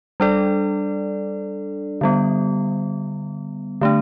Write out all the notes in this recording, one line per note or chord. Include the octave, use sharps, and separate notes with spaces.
G3 D4 A4 D5
D3 G3 B3
D3 A3 D4